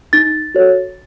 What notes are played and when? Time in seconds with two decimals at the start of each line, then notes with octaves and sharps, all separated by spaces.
0.13 D#4 A6
0.55 F#4 A4 C#5